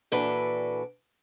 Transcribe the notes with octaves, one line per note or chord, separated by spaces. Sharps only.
A#2 E3 D4 F#4 A4 B4